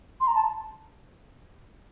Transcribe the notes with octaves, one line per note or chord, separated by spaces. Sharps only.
C6
A#5
A5